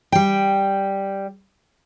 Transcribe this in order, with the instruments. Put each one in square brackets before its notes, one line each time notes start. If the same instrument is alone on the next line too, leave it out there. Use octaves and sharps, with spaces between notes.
[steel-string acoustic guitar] G3 G5